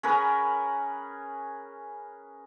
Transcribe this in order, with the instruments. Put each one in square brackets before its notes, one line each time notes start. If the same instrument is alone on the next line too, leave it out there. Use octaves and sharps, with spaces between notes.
[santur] C#4 G#4 A#4 B4